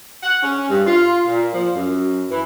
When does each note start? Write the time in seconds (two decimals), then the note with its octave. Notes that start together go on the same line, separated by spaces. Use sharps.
0.23 F#5
0.42 C#4
0.69 G2
0.87 F4
1.27 A#2
1.53 F3
1.75 F#2
2.30 E3